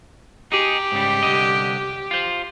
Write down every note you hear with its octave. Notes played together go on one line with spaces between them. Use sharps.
D#4 G4 G#4
G#2 C#3 G3
C2 D3 D#5
F4 C5